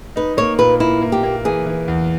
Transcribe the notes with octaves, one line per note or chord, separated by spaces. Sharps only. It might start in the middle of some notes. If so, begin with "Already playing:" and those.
D#4 B4
A#3 C#5
A#2 B4
A#3 E4
A#3
G4
A#3
E3 G#4
E3
E2